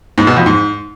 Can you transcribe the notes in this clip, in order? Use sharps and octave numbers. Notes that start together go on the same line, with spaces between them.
G#2
B2
F2
G#2